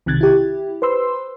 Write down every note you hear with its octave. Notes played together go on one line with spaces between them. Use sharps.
B1 C3 D#3 F#6 G#6 A6
E4 G4
B4 C5 C6 E6